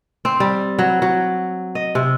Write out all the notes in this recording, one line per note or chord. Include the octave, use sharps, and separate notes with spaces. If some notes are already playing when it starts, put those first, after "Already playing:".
C4
G3
F#3
F#3
D#5
C3